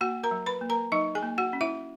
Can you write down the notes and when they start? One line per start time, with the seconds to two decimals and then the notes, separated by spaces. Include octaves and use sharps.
0.01 A#3 F#4 F#5
0.24 A#4 A#5
0.31 F#3
0.46 B4 B5
0.61 A#3
0.70 A#4 A#5
0.92 F#3 D#4 D#5
1.15 G#4 G#5
1.23 A#3
1.38 F#4 F#5
1.53 C#4
1.61 E4 E5